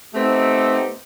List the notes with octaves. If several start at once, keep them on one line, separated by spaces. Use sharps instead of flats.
A3 B3 C4 D#4 G4